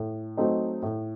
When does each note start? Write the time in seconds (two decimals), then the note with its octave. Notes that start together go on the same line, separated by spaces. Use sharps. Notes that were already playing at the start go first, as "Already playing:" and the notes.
Already playing: A2
0.37 F#3 A3 C4 D#4
0.82 A2